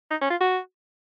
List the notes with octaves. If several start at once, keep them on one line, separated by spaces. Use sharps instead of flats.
D#4
C#4
F4
F#4